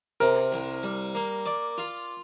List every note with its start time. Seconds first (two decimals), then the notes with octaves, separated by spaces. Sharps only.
0.20 C3 A#4
0.52 C2
0.83 G3
1.15 A#3
1.46 D5
1.78 F4